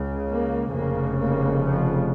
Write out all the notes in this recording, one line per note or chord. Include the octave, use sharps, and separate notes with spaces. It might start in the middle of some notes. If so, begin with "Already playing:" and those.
Already playing: C#2 C#3
A#3
F1 F2 C#3 A#3
A#3
F3